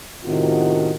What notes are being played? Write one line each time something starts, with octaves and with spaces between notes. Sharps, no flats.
A2 C3 D#3 B3 F4 F#4